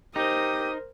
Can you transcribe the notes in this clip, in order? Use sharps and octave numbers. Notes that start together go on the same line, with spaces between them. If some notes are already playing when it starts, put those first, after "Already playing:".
D#4 G4 A#4 C5 D#6